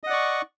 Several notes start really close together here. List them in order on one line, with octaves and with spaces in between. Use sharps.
D#5 F#5 D5 C#6